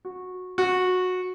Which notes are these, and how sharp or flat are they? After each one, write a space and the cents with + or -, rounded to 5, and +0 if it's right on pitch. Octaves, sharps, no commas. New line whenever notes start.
F#4 -15
F#4 -15